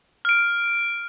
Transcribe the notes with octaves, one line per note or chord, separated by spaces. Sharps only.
F6 D7